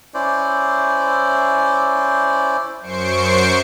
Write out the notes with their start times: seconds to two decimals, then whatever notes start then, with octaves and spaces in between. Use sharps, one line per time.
0.14 C#4 E4 C5 D5
2.81 F#2 C5 C#6 C7 D7